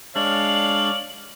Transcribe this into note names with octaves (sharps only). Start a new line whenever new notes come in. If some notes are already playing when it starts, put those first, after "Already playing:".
G#3 D4 C#5 D5 F5 F#7